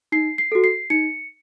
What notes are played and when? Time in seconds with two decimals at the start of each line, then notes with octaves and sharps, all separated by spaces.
0.12 D#4 C7
0.38 C7
0.52 F#4 A4
0.64 C7
0.90 D#4 C#7